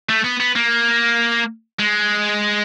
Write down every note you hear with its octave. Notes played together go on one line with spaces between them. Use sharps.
A3
B3
B3
A#3
G#3